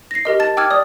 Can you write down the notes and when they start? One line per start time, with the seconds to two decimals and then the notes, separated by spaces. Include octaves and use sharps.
0.11 A#6 C7
0.25 G4 A#4 D#5
0.40 A5 A6
0.57 G5 D6 E6 F6 G#6
0.71 D5 D#6